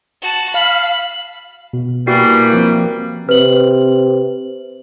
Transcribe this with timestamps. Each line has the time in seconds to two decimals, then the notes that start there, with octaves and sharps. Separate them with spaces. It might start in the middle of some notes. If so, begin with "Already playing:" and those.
0.22 F#4 A5
0.54 F5 B5
1.73 B2
2.07 E3 G3 A#3 F#4 C7
2.53 F3 C4
3.29 C3 B4 F#7